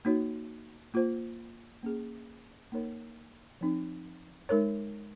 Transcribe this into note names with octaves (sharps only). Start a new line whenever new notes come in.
A#3 D#4 F#4 C#5
A#3 F4 C5
A#3 C#4 G#4
A#3 D#4 A#4 C#5
F3 C4 D#4
G#3 D#4 A#4 C#5